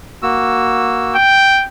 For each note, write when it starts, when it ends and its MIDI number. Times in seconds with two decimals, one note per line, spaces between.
0.23 1.16 58
0.23 1.16 66
0.23 1.16 88
1.16 1.66 79